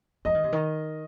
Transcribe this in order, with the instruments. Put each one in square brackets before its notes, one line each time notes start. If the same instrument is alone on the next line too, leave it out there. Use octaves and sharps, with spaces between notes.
[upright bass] F3 [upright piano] D#5
[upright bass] D#3
C3
D#3